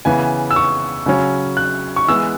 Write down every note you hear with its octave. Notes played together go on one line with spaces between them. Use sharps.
C#3 E3 B3 G#5
E6
C#6
C#3 F#3 C#4
F#6
C#6
E3 G#3 B3 E6